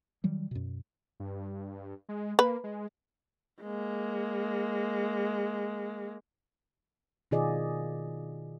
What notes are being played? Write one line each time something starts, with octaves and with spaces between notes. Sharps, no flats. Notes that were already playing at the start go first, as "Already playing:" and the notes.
D#3 F#3 G3
F#2 B2
G2
G#3
A#3 B4
G#3
G#3 A#3
B2 D#3 F4 G#4 D5 D#5